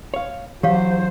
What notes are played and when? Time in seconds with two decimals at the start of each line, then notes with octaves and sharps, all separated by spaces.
0.14 C#5 F5
0.63 E3 F#3 G4 C5 C#5 F5